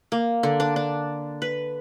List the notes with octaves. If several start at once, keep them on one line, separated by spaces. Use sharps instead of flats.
A#3
D3
D4
D4
B4